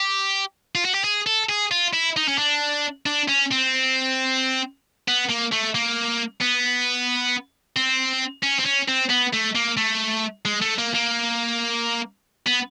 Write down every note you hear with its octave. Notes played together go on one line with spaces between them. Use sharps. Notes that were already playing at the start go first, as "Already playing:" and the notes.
Already playing: G4
F4
F#4
G4
G#4
A4
G#4
F4
E4
D#4
C#4
D4
D4
C#4
C4
B3
A#3
A3
A#3
B3
C4
C#4
C4
C#4
C4
B3
A3
A#3
A3
G#3
A3
A#3
A#3
B3